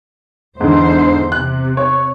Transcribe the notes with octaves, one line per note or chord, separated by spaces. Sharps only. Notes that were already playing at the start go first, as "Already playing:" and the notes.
E2 G#2 D3 C5
C3 F#6
C#5